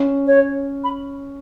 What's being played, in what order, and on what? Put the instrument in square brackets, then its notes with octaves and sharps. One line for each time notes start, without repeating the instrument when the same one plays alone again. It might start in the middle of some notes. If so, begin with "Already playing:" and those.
Already playing: [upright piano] C#4
[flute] C#5
B5